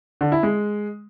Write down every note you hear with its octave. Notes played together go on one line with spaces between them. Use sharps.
D3
E4
G#3